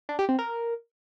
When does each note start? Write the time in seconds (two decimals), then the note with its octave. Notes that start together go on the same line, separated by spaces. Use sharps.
0.09 D4
0.19 G4
0.29 C4
0.39 A#4